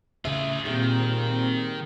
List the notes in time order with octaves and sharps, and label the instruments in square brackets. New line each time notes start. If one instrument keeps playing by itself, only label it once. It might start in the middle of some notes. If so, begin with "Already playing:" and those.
[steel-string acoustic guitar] A2 C#3 E5 [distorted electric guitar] F4 G#4
[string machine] A#2 C4 [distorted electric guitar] D#3 [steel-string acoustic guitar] G3 G#4